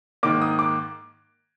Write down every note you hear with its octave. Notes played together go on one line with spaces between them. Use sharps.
G#2 D#3 A#3 D6
D#6
D6